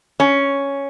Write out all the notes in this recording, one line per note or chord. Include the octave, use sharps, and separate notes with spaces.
C#4